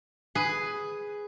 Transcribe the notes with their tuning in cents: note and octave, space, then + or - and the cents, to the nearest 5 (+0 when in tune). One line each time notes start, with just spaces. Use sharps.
G#4 +0 B4 +5